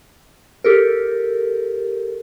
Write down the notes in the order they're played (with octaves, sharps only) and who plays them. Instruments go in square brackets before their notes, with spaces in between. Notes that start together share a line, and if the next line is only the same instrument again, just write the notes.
[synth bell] G4 A4 A#4